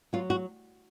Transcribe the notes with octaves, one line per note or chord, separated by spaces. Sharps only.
F#3 F4
F#4